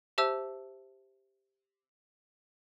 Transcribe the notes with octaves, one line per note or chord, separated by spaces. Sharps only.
G4 C5 E5 A5 E6